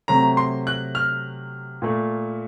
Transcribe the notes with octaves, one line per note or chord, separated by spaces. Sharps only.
C3 F#3 A3 A#5
C6
F#6
F6
A#2 A3